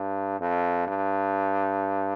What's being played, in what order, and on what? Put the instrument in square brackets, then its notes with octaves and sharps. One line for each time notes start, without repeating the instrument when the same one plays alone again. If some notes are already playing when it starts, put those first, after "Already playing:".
Already playing: [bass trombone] G2
F2
G2